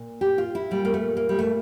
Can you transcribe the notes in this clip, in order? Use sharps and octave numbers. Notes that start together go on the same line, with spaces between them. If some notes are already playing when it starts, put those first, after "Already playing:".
Already playing: A#2
G4
F4
E4
A#2 G3
A#3
A3
A#3
G3
A3